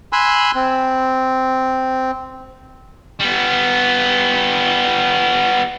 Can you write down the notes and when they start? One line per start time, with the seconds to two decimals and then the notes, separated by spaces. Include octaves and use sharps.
0.13 G#5 B5 C6 E6 F#6
0.55 C4
3.19 G3 B3